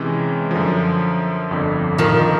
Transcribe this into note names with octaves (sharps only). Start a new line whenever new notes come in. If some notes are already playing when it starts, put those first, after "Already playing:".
Already playing: C3 E3 G#3 C#4
F#2 D3 F3
G1 F2 D3
D#3 F3